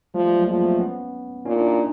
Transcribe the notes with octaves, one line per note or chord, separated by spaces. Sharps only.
F3 G3 A3
G3 A3
F#3 G#3
F3 G#3 A#3
A3 B3
B3 C#4
A#2 C#4 D#4
D4 E4
D#4 F4